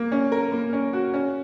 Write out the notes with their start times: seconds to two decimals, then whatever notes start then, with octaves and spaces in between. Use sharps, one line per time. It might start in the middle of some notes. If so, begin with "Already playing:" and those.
Already playing: A#3
0.12 C#4
0.32 A#4
0.52 A#3
0.73 C#4
0.93 F#4
1.14 C#4